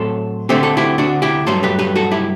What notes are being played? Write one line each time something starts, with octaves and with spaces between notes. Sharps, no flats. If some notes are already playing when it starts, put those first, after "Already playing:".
Already playing: A2 F#3 A3 C4 A4 C5
D2 D3 A3 C4 G4
A4
E4 G4
D4 F#4
E4 G4
G2 F#3 A3 A4 C5
G4 B4
G4 B4
F#4 A4
E4 G4